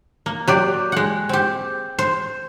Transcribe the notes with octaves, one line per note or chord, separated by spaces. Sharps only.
A#3
F#3 G4 D5
G#3 F#5
C4 G4
C5